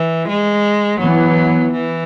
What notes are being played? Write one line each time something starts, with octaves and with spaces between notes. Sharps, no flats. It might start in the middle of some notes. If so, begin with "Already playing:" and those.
Already playing: E3
G#3
E3 F#3 B3
E3